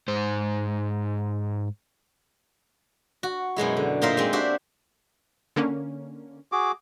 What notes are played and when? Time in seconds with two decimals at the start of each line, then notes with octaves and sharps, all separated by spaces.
0.08 G#2 C5
3.23 F#4
3.56 F#2 B2 G#3 E4
3.77 D3
4.02 A#2 A#3 D#4 A#4 C5 E5
4.17 G#3 C4
4.33 D4 F#4 G4 C5 E5
5.56 D3 A#3 C#4
6.52 F#4 G#4 D6